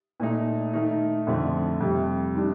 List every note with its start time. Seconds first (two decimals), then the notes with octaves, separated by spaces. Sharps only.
0.20 A#2 A3 D#4
0.73 D#3 A3 D#4
1.27 F2 D3 F3 A3
1.80 F2 C3 G3
2.34 D#3 G3 D4